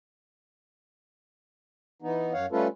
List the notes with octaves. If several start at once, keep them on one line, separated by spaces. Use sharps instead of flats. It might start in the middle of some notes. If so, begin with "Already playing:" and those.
E3 B3 D#4
F#2 C#5 F5 F#5
G3 A3 C#4 F4 A4 B4